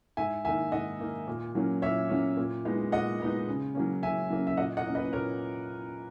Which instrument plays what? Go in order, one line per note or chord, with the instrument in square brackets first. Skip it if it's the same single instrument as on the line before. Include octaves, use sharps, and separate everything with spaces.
[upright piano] G#2 E5 G#5
D#3 A#3 D#4 E5 G#5
G#2 D#5 F#5
D#3 A#3 D#4
A#2
F#3 A#3 C#4
A#2 C#5 E5
F#3 A#3 C#4
A#2
G#3 B3 D#4
A#2 D#5 F#5
G#3 B3 D#4
C#3
F#3 A#3 C#4
C#3 E5 G#5
F#3 A#3 C#4
E5
A#2 D#5 F#5
D#5 F#5
A#3 C#4
B4 D#5
A#2 A#4 C#5